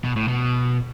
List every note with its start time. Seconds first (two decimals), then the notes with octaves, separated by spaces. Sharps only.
0.05 B2
0.16 A2
0.28 B2